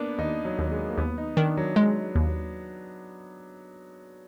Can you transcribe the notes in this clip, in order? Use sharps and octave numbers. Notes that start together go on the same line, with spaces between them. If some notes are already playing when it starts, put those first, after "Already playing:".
Already playing: A#3 B3 D4
D#2 D#4
F#3
D#2
G#3
A#3
D#2 B3
D#4
D#3 D4
F#3
G#3
D#2